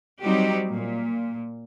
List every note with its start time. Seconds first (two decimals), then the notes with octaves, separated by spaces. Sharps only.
0.21 F#3 G3 C4 D#4 F#4 G4
0.71 A#2